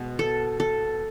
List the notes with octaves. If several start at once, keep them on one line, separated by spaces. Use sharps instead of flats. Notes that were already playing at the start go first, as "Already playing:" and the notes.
Already playing: B2 G#3
A4
A4